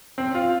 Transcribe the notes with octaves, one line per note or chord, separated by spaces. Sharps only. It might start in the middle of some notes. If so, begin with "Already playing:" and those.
C4
F4